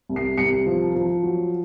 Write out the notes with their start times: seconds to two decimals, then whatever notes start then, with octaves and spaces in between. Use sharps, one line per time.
0.09 C2
0.16 C7
0.38 C2 C#7
0.66 F3
0.95 F3
1.23 F#3